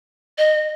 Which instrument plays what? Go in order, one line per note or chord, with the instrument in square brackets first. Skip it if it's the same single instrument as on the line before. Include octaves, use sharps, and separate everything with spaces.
[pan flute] D#5